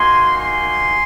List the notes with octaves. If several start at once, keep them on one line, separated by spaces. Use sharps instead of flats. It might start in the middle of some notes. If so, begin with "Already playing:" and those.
Already playing: A#3 D#4 F#4 G#5 C6
G#5 C6